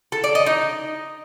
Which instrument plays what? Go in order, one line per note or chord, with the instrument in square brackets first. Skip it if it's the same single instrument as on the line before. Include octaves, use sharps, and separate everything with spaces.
[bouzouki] A4
D5
D#5
D#4